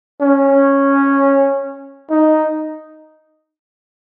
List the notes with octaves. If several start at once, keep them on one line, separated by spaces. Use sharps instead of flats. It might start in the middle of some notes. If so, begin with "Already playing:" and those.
C#4
D#4